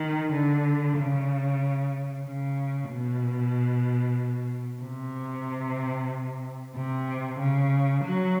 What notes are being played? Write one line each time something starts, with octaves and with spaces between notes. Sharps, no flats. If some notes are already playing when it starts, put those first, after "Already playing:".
Already playing: D#3
D3
C#3
C#3
B2
C3
C3
C#3
F#3